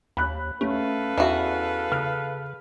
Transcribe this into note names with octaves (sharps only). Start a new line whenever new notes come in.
D#2 B5 F#6
A3 C#4 A4 B4 F5
E2 E3 F#4
C#3 F6